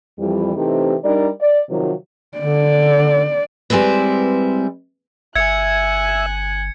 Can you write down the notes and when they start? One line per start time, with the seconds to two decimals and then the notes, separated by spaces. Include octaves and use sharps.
0.19 F2 E3 G3
0.56 C3 E3 A3 C4 D#4 G4
1.04 G3 D4 D#4 A#4 D5
1.41 D5
1.70 C3 D#3 F3 F#3
2.38 D3 D5
3.70 G3 G#3 C4 E4 B4
5.36 G1 E5 G#5 F#6 G#6 C#7